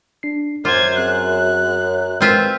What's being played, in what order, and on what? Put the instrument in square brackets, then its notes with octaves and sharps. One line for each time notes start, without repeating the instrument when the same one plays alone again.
[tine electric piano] D4 C7
[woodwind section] F#2 [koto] F4 [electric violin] C5 G#6 [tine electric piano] C6 D6
[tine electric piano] C4 G#4 [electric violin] F#6
[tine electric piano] G#3 A#4 B4 [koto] C4 F4 E5